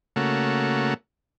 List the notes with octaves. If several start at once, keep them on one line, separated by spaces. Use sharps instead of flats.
C#3 A3 A#3 F#4